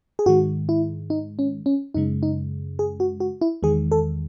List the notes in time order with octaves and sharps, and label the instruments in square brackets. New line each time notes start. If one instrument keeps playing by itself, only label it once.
[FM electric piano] G#4
G#2 D#3 G#3 F#4
E4
D#4
C#4
C#4
F#2 C#3 G#3 D#4
D#4
G#4
F#4
F#4
E4
E2 D#3 G#3 G#4
A4